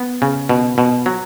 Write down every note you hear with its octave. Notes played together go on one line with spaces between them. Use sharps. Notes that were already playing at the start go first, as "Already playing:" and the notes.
Already playing: B3
C#3
B2
B2
F#3